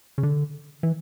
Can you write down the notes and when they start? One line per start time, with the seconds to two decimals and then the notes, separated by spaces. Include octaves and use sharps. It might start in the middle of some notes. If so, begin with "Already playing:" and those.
0.18 C#3
0.23 D3
0.83 E3